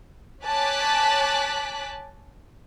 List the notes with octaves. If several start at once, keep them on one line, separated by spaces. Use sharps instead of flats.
C#5 G#5 A5 D6 F#6 B6